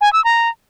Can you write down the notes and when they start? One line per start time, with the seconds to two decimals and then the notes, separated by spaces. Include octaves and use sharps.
0.01 G#5
0.13 E6
0.25 A#5